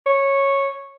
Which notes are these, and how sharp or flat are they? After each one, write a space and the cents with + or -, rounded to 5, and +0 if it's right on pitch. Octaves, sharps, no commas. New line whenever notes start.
C#5 -10